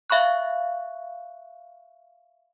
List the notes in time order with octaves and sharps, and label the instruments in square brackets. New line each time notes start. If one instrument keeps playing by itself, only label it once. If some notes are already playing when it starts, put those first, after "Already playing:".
[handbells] E5 F5 B5 C#6 F#6